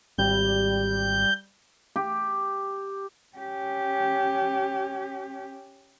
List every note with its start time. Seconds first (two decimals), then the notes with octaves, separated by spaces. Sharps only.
0.18 G#1 G3 G6
1.96 G4
3.36 C#4 G4